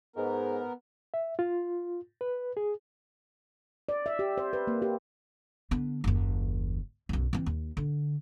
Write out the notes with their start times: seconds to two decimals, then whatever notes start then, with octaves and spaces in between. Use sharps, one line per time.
0.16 G#2 B3 A#4
1.14 E5
1.39 F4
2.21 B4
2.57 G#4
3.89 D5
4.06 E5
4.19 G4
4.38 C5
4.53 B4
4.67 A#3
4.82 G4
5.71 D3 B3
6.04 F#1 D#2
7.09 B1 F#2
7.33 E3 C4
7.46 D#2
7.77 D3